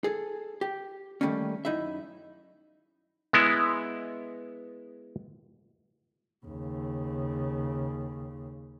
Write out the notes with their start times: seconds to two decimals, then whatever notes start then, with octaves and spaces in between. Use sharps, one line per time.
0.04 G#4 A4
0.61 G4
1.21 D#3 E3 G3 A3 A#3 C#4
1.65 F#2 D#4 E4 E5
3.33 G#3 B3 E4
6.46 D#2 C#3